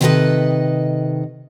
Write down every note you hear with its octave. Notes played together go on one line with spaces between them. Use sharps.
C3 D#3 G#4 A4 B4 D#5